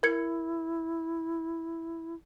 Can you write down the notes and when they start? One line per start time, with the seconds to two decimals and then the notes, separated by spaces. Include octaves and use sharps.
0.03 E4 A#4 G#6 C#7